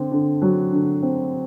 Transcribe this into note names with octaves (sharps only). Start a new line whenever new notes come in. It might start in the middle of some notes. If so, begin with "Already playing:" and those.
Already playing: D3 C4
D3
F#3
D3
C4